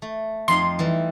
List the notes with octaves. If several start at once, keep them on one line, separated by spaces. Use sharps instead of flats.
A3
F2 D#4 C6
E3 G3